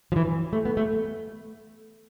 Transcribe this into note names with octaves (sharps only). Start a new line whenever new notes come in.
F3
E3
A3
B3
A3